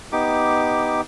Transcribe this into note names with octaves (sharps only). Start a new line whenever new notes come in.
B3 D#4 G4 D6